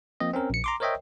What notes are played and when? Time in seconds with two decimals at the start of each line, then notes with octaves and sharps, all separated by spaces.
0.20 F3 A#3 C4 D#5
0.34 C4 C#4 A#4
0.50 A#1 C#7
0.64 A#5 C6 D6
0.80 A#4 C5 C#5 D#5 E5 G5